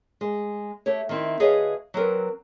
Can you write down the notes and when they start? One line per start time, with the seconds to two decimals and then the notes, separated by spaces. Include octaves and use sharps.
0.21 G#3
0.86 A3 G4 C#5
1.09 D#3 C4 E4
1.40 D2 G#4 B4 C#5 D#5 F5
1.94 F#3 C4 A#4 B4